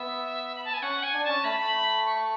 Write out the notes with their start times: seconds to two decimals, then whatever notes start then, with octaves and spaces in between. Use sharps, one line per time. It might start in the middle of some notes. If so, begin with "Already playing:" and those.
Already playing: B3 E5
0.55 B5
0.65 A5
0.74 G#5
0.82 C#4 F#5
1.03 G#5
1.14 D4
1.24 C#4 A5
1.44 A3 B5
2.06 C#6